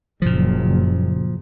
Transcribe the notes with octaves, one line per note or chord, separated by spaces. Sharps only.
F#1 A#2 F3